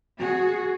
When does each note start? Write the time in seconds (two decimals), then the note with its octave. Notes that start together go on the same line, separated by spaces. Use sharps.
0.20 F#4 G#4